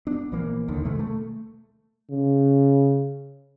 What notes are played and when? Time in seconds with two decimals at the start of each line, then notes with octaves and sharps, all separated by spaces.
0.07 B3 D4
0.32 A#1 E3 A#3
0.68 D#2 D3 D#3
0.85 B2 D#3 G#3 A3
0.99 A3
2.11 C#3